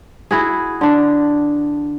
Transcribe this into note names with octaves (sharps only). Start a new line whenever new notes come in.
E4 F#4 G#4
D3 D4